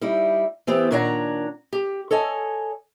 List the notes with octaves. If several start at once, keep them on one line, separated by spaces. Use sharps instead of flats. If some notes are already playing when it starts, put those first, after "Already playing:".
G3 D#4 E4
E3 B3 C4 G4
A#2 D#3 D4 C#5 F#5 A#5
G4
A4 C#5 D#5 G#5